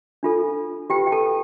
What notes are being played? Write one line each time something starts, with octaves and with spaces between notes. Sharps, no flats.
D4 F4 A4
F4 G4 B4 G5
G5
A4 A5